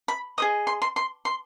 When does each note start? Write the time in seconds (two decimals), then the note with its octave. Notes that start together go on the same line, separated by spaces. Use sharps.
0.08 B5
0.38 G#4 C5 D#5 D#6
0.67 C6
0.82 C6
0.96 C6
1.25 C6